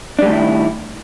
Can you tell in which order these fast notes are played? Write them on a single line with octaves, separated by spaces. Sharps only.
D4 G3 A3 D#3 E4